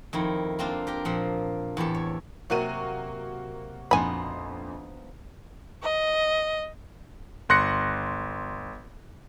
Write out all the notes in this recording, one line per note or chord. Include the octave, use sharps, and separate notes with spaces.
F2 D#3 E4 F4
A#3 C4 D4 F4
G4 A#4 G5
A#2 F3 F#5
E2 A2 G4 A4
C#5
C3 F#3 A#3 F#4 D#7
A#1 F2 F3 B3 D#4 G#5 B5 C6
D#5
G1 C6 F#6 A#6 C#7